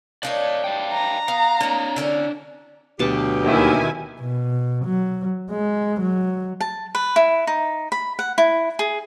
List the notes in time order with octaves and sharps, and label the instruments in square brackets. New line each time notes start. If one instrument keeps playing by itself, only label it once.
[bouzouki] D4 D#4 C#5 [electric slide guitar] D5 F5
[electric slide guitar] D5 F5 G5
[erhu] A#5
[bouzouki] B3 [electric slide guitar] F5
[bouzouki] A#3 D#4 [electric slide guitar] D4 C#5
[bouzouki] D3 C#4 A#4
[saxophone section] D2 F#3 G4 [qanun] B2 A5
[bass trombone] D#2 [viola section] D#3 E4 G#5
[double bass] B2
F#3
G#3
F#3
[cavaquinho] A5
B4
E4
D#4
B5
F#5
E4
G#4